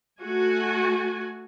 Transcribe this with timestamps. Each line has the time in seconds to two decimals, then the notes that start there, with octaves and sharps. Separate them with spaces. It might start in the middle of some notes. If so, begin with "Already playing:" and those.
0.20 A3 F#4 G#5